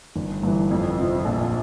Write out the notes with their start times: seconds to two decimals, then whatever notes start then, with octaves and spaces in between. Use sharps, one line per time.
0.16 G1
0.43 G2 E3
0.71 F2
0.98 C3 F3
1.25 A#1